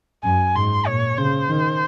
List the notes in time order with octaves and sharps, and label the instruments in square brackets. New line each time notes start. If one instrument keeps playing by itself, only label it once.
[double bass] F#2 [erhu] G#5
[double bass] G#2 [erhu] C6
[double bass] A#2 [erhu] C#5
[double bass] C#3 [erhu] C5
[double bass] D#3